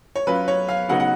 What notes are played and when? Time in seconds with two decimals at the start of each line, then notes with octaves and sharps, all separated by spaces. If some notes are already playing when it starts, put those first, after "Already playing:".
0.16 C#5
0.27 F#3 C#4 F4 B4
0.48 C#5
0.69 F5
0.89 C#3 F#3 B3 D#4 F#5
1.00 F#5